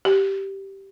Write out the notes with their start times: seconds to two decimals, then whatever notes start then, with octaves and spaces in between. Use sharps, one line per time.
0.05 G4